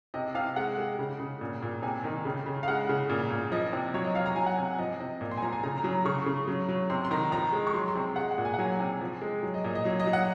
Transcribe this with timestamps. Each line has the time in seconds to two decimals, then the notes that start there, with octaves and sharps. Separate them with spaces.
0.14 C3 D#5
0.35 C3 F5
0.56 G#3 F#5
0.78 G#3
0.99 C#3
1.20 C#3
1.41 A#2
1.62 A#2
1.82 C3 G#5
2.04 D#3
2.25 C#3
2.46 C#3
2.63 F5
2.68 G#3 F#5
2.89 C#3
3.10 A#2
3.31 A#2
3.52 F3 D#5
3.73 C3
3.94 F#3 C#5
4.04 D#5
4.15 F#3 F5
4.26 A#5
4.36 F#3 G#5
4.46 F#5
4.57 C3 G#5
4.79 F3 D#5
5.00 C3 D#5
5.21 A#2
5.31 C6
5.37 G#5
5.42 F3 A#5
5.53 G#5
5.63 C#3 A#5
5.78 A#5
5.84 F#3
6.05 C#3 C#6
6.26 C#3
6.48 F#3
6.69 F#3
6.90 C3 C6
7.05 C6
7.11 D#3 A#5
7.32 F3 A#5
7.52 G#3
7.67 C#6
7.74 F#3 C6
7.88 C6
7.95 C3
8.16 G#3 F#5
8.31 F#5
8.38 A#2
8.45 G#5
8.54 F#5
8.58 F#3 G#5
8.80 C3
9.01 F3
9.21 G#3
9.43 F#3
9.54 D#5
9.64 A#2 D#5
9.75 D#5
9.85 F#3
10.00 D#5
10.07 F#3
10.13 F#5